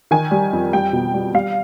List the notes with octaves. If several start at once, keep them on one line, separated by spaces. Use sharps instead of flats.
D#3 G#5
G3
F2
G3 G5
B2
G3
G3 F5